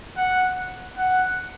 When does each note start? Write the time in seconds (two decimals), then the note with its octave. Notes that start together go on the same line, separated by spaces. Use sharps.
0.17 F#5
0.97 F#5